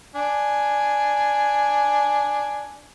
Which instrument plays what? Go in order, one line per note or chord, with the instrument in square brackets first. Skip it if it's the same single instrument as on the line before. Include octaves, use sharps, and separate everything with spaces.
[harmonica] D4 G#5